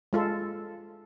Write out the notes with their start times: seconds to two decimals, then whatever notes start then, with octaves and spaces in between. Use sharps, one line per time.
0.13 G#3 F4 A4